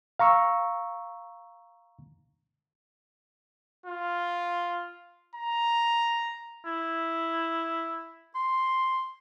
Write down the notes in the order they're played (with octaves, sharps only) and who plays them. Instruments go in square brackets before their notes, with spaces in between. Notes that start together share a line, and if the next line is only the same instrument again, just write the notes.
[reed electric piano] F5 A#5 C#6 E6
[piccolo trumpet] F4
A#5
[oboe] E4
C6